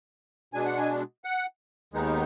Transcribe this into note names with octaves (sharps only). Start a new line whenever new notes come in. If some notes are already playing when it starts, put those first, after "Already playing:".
B2 G#3 D4 G#5
F#5
G#5
F#5
D#2 D#3 G#3 B3 D#4